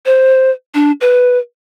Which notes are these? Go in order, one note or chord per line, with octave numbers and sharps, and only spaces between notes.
C5
D4
B4